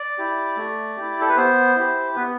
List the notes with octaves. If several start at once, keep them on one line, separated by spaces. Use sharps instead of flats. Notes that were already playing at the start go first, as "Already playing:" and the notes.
Already playing: D5
E4 G4
A3
E4 G4
A4
B4
B3 C5
E4 G4
B3 B4